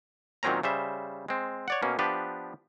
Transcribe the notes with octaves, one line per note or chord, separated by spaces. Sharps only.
A#2 D#3 F#3 C4 C#4 A#5
C#3 G3 C5 E5
G#3 C4
C#5 D5 F#5
B2 A#3 C#4
F3 B3 D4 G4 B4